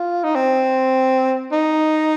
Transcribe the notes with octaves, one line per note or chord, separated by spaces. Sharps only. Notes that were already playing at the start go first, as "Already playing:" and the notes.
Already playing: F4
D#4
C4
D#4